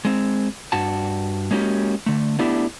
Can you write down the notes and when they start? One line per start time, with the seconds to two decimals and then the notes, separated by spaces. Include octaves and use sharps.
0.05 G#3 C4
0.72 G2 F#4 A5
1.51 G#3 A#3 C#4 F#4 G4
2.06 D3 A3
2.39 A3 B3 D4 E4 G4